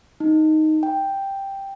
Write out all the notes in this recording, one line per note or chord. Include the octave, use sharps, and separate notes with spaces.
D#4
G5